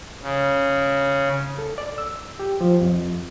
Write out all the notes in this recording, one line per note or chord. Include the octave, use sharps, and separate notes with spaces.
C#3
A4
D5
E6
G4
F3
F2